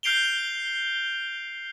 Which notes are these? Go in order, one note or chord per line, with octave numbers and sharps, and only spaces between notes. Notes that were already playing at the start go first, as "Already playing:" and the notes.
F6 G6 C7 D7 F7 G7